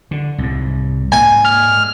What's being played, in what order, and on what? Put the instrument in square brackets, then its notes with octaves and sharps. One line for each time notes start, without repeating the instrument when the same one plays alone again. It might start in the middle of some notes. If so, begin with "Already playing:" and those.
[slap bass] D3
C2 G#2
[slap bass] G#2 A#3 [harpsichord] G#5
[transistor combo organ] F6